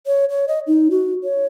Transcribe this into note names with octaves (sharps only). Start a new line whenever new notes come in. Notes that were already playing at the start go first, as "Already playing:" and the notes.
C#5
C#5
D#5
D#4
F#4
C#5